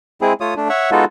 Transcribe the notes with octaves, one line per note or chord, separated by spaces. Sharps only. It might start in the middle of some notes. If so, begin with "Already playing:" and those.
G#3 C4 E4 G#4
A3 F4 C#5 D#6
A3 D4
C#5 E5 F#5 C#6
G#3 B3 D#4 F4 F#4 A4